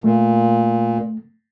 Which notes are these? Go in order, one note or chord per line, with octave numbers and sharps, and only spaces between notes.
A#2 A3